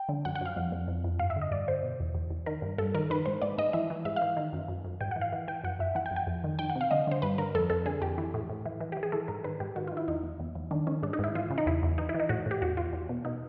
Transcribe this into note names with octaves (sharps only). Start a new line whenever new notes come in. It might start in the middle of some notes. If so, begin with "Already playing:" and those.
Already playing: G5
D3
F#2 F#5
F#5
F#2 F5
F2
F2
F2
F2
G2 F5
E5
D3
D#5
G2 D5
D3 C5
B2
E2
E2
E2
D#3 A#4
G2
G2 A4
D#3 A#4
D#3 B4
G#2 C5
G#2 D5
G#2 D#5
E3 E5
E3
G#2 E5
F5
E3
D#3
F#2
F#2
F#2
G#2 G5
E3 F#5
F5
E3
E3 G5
F#2 F#5
F#2 E5
E3 F#5
G5
F#2
G5
F2
D#3
D#3 G5
F#5
C3
F5
D3 D#5
D3 C5
G2 B4
D3 A#4
F2 A4
F2 A4
D3 G#4
F2 G4
E3
A2
A2
E3
E3
E3 G4
G#4
E3 A4
G#2 A#4
D#3 B4
G#2 G4
D#3 F#4
D#3 F4
E4
E2 D#4
E2
E2
E2
D#3 D4
D#3 C#4
G#2 D4
D#4
G#2 E4
E3 F4
C#3
D#4
E2 E4
E2
E3 D#4
E4
E3
D#4
A2 F#4
A2 G4
E2 F#4
E2 F4
E2
B2
B2 D#4